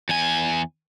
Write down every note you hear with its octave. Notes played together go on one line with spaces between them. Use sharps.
E2 G#5